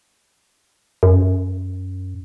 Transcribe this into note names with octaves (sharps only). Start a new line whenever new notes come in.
F#2